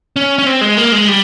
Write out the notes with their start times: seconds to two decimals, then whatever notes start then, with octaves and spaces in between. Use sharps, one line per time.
0.16 C#4
0.39 C#4
0.46 C4
0.61 G#3
0.77 A#3
0.92 G#3
1.08 G3